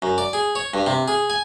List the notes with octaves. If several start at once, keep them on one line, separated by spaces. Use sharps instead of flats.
F#2
D5
G#4
C#5
G2
C3
G#4
G#5